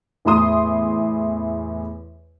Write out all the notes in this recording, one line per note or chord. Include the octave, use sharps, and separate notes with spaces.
E2 A2 E4 C6 D#6